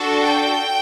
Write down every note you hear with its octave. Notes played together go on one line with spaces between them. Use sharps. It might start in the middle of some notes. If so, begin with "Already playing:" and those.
Already playing: D4 F#4 A4
G5